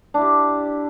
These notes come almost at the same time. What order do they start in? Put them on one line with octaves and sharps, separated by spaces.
D4 E4 G4